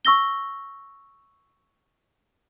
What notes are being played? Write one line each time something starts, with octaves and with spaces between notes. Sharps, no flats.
C#6 E6 A#6 G7